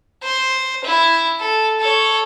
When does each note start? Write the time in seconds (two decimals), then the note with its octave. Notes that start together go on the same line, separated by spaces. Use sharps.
0.23 C5
0.84 E4
1.40 A4
1.79 A4 C#5